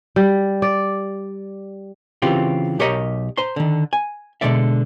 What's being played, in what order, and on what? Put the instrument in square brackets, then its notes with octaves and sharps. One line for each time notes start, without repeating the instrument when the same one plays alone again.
[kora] G3
D5
[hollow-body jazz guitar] C#3 E3 C4 F4 G4
B1 G4 A#4 C#5 D#5 A#5
C5 A#5 C6
D3 D#3
G#5
B2 D3 D#3 G#3 D5 E5